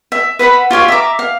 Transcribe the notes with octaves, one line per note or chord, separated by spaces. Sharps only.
E5
B4 E5 F#5 B5
F4 G4 C#5 F5
E5 A#5 D6
F5